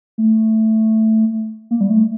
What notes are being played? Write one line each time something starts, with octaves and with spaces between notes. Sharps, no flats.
A3
A#3
G3
A3